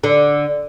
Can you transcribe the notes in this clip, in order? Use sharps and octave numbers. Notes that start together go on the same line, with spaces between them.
D3